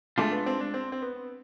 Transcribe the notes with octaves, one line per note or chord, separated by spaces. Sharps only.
G#3 A3 D4 F4
B3
C4
D4
C4
C4
B3